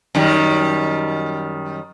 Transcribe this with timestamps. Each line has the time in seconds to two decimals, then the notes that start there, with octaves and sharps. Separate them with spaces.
0.15 F#2 D#3 G3